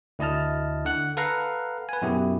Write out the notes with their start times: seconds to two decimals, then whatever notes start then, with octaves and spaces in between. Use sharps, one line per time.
0.19 D2 E4 D#5 A5 F6
0.85 D3 F#5 F#6
1.17 A4 B4 F5 F#5 A#5
1.89 B4 G#5
2.02 F#2 B2 E4 G4 G#4